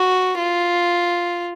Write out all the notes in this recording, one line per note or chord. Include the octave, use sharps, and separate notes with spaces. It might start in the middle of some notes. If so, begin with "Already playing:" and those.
Already playing: F#4
F4